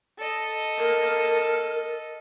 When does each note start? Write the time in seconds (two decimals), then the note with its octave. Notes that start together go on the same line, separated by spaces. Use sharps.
0.18 A4 D#5
0.78 A#4